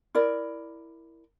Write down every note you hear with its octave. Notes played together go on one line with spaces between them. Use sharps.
E4 A#4 D5